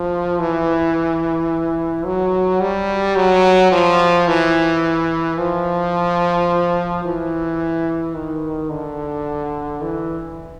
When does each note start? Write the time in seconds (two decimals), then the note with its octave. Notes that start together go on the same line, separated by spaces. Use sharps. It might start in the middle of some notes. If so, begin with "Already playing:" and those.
Already playing: F3
0.39 E3
2.05 F#3
2.61 G3
3.16 F#3
3.72 F3
4.28 E3
5.38 F3
7.05 E3
8.15 D#3
8.70 D3
9.82 E3